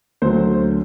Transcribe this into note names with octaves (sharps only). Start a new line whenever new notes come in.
D2 D3 F#3 C5